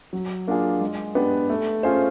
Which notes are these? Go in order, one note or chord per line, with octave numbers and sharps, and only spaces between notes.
F#3
A#3 D4 F4 G#4
G#3
B3 D4 G4 B4
A3
C#4 F4 G#4 C5